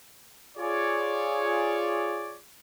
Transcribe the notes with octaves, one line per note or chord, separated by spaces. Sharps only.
F4 G#4 C#5 D5